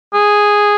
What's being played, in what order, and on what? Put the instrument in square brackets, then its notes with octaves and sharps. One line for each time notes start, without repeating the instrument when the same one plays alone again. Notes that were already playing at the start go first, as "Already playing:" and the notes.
[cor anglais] G#4